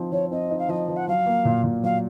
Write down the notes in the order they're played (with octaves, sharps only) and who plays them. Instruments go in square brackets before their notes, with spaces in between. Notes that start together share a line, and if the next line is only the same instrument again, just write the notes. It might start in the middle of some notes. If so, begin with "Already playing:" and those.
Already playing: [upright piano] F3 C4 D#4
[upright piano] F3 [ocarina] C#5
[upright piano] C4 [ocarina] D#5
[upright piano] D#4
[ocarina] F5
[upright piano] F3 [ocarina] D#5
[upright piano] F3
[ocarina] F#5
[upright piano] F#3 [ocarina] F5
[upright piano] A#3
A#2
A#2
[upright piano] F#3 [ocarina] F5